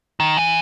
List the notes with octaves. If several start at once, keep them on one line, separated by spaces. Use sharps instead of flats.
D#3
E3